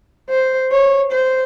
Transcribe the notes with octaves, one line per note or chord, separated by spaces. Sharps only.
C5
C#5
C5